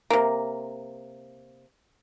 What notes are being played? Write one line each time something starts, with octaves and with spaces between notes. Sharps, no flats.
C3 A#3